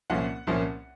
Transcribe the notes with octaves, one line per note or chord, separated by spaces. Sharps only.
C2 A#2 F3 A#3 C#4 F#5
C2 A#2 F3 A#3 C#4